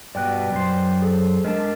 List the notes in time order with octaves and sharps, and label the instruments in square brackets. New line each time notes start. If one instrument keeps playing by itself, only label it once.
[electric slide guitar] G2 B2 [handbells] D5 G5 F#6
[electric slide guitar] F#2 C5
[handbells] G#4 A4
[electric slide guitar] G#3 D4 A5 [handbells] A#4